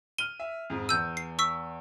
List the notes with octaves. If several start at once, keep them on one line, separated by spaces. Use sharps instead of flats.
F6 D#7 G7
E5
F2 G#2
E2 E6 G6 D#7
C7
C#6 E6 B6